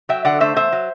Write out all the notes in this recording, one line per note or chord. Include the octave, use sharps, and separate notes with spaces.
F#3 E5 G5
D3 D5 F#5
A3 C5 E5
E2 C5 E5
F#3